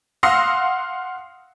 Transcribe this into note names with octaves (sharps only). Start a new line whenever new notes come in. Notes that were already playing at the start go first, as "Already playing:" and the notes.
F5 F#5 C6 D#6 E6 A#6